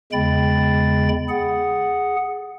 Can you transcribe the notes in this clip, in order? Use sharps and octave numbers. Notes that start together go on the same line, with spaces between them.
E2 C#3 G#3 G5 B5 A6
G#4 F#5